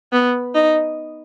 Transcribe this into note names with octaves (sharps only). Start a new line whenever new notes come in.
B3
D#4